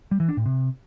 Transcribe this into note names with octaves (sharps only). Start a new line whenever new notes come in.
G3
E3
D4
A2
C3